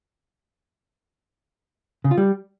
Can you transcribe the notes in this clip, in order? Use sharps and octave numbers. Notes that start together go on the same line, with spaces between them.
C#3
F4
G3